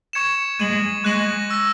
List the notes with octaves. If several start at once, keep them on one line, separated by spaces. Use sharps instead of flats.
C#6 G#6 C#7 E7
G#3 G#6 D#7 F#7
G#3 C#6 F#6 A#6 D#7 F#7
C#6 E6 A#6